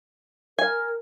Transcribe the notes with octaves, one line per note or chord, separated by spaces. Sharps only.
A#4 G#5